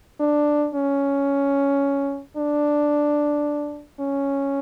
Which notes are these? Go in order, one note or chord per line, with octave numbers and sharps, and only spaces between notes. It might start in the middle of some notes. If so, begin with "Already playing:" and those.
D4
C#4
D4
C#4